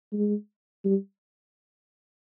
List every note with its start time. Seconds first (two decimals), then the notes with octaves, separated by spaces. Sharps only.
0.13 G#3
0.85 G3